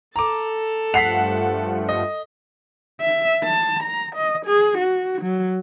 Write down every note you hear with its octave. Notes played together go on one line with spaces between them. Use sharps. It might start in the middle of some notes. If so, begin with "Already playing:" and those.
A4 A5 A#5 D6
G2 F3 A3 F#5 B6 C7 F7
D#5
E5
A5
A#5
D#5
G#4
F#4
F#3